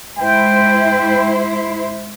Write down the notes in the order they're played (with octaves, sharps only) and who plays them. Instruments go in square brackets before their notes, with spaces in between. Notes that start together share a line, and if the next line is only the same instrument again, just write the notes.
[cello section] G#2 E4 C5 [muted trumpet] G5